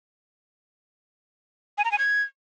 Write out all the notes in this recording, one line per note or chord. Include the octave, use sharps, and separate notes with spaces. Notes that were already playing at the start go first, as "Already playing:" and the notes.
G#5
A#5
G#5
G#6